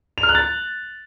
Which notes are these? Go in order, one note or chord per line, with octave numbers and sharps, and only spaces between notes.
F7
F6
F#6
A6